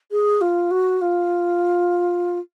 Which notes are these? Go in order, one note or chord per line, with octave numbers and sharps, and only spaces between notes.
G#4
F4
F#4
F4